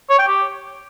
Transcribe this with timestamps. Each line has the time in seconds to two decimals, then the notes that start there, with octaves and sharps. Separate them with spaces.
0.10 C#5
0.19 G5
0.28 G4